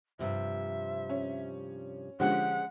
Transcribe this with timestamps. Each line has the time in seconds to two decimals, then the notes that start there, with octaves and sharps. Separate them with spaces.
0.19 G2 C3 F3 E5
1.09 C#4
2.20 D3 F3 G#3 C#4 G4 C5 F#5